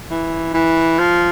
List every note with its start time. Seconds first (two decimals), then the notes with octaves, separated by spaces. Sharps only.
0.10 E3
0.54 E3
0.99 F3